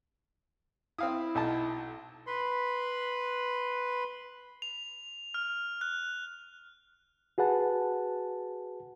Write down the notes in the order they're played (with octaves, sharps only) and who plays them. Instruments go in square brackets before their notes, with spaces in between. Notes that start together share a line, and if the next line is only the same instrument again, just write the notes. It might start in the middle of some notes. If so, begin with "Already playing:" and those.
[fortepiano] C4 F5 D#6 [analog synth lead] E4
[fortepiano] B1 D#4 A5
[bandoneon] B4 B5 C6
[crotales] F7
F6
F#6
[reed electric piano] F#4 G#4 B4 F#5 A5